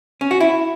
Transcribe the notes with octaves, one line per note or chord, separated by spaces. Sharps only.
C#4
F#4
E4